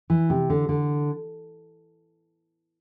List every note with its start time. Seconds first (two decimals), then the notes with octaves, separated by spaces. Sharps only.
0.10 E3
0.30 C3
0.50 D3
0.69 D3